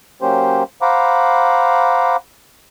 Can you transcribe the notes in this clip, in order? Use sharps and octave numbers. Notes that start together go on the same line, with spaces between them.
F#3 A#3 C#4 G4 C5
C5 F5 F#5 A#5 B5 D6